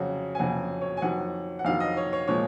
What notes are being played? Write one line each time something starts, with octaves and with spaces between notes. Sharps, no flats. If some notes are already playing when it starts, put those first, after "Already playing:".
Already playing: F2 C#3 F#3 F#5
G#5
F2 C#3 F#3 F#5
C#5
G#5
F2 D#3 F#3 F#5
F#5
F2 D#3 F#3 F5
D#5
C#5
C#5
A#2 F3 G#3 C#5